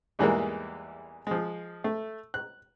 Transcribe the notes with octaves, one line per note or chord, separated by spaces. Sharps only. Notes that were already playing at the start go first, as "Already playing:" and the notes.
E2 G#2 E3 G3 G#3 A#3
F3 G#3
A3
F#6